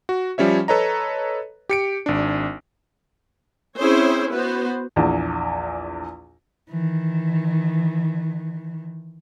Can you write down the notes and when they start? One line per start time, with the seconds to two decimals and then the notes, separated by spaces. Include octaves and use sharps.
0.09 F#4
0.38 F3 G3 C#4 C#5 E5
0.68 A4 B4 C#5 D#5 A#5
1.69 G4 C#7 D7
2.06 G#1 D4
3.78 C4 C#4 E4 G#4 C5 C#5
4.33 B3 F#4 B4 C5
4.96 A#1 E2
6.69 D#3 E3